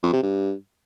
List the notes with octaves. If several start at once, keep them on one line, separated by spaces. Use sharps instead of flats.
F2
C3
G2